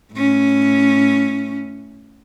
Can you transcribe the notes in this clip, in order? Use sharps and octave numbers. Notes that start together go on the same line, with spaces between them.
A2 C#4